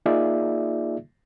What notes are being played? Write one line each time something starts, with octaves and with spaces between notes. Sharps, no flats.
A#3 D#4 F4 G#4 D5 E5